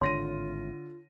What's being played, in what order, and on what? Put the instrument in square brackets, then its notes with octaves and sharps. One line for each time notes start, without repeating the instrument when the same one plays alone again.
[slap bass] G#1 A2 [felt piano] D3 A#6 D#7 [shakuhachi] F4 [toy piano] C#5 C6